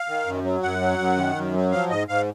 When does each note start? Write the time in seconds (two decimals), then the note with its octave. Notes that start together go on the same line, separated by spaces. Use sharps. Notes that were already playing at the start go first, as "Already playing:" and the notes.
Already playing: F5
0.09 D#3
0.26 F#2
0.44 F#3
0.62 F#2 F#5
0.81 F#3
0.99 F#2
1.17 D#3
1.36 F#2
1.54 F#3
1.72 F3 F5
1.90 G#2 D#5
2.08 G#2 F5